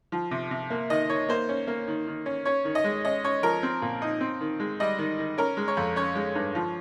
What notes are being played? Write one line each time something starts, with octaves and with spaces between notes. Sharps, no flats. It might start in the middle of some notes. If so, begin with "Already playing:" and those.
F3
C3
C3
A#3
D#3 D#5
D#3 C#5
A#3 C5
C#4
A#3
D#3
D#3
C#4
C#4 C#5
D#3
D#5
G#3
C#4 D#5
C#4 C#5
F3 A#4
C4
A#2
D#4
C4
D#3
G#3
G3 D#5
D#3
D#3
C#4 A#4
G#3
C#5
F2
C#4 C#5
G#3
G2
F3